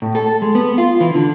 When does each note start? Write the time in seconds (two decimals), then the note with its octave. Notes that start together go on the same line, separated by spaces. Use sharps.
0.02 A2
0.15 A4
0.42 G#3
0.55 B3
0.78 F4
1.00 E3
1.15 D3